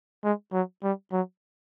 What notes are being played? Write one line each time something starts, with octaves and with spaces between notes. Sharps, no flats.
G#3
F#3
G3
F#3